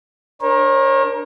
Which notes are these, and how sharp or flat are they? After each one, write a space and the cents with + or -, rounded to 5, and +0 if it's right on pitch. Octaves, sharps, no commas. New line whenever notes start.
D4 +0 A#4 +20 C#5 -40